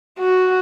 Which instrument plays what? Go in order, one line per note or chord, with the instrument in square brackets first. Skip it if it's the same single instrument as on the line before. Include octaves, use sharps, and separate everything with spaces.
[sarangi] F#4